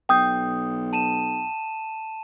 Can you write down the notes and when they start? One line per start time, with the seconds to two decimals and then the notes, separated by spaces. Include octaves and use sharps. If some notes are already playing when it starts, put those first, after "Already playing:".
0.09 B1 G5 D#6 G6
0.93 A5 D#7 E7